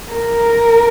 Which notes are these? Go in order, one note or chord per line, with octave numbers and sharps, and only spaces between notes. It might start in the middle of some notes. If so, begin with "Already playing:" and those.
A#4